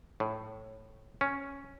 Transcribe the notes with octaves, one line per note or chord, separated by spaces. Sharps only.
A2
C#4